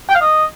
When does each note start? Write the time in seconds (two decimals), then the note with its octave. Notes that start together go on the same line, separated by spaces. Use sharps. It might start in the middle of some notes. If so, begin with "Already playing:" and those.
0.09 G5
0.15 F5
0.21 D#5